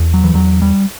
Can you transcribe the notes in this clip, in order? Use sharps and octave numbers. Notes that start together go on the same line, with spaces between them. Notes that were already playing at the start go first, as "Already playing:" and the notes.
Already playing: E2
F#3
E3
E2 F#3
G3